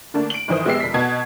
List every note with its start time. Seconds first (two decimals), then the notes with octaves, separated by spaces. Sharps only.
0.14 D3 A3 A#3 D4
0.30 D7 F#7
0.48 G1 D#3 E3 C5 D#6
0.65 A#1 G#3 B3 G4 E6 C7
0.80 F1 B6
0.94 B2 D#5 F#5 A5 G#6